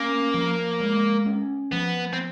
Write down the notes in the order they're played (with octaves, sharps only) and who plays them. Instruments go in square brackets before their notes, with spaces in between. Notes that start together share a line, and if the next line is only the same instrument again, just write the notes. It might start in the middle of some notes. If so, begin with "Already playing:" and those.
Already playing: [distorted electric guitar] A#3 [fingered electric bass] C#4
[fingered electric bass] F3
G#3
C#4
[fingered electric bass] F3 [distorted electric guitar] B3
[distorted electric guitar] C4